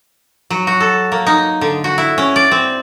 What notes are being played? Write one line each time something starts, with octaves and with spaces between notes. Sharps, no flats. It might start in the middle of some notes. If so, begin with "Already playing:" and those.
F#3
F#4
A4
A#3
D#4
D3
F#4
E4
C#4
D5
C4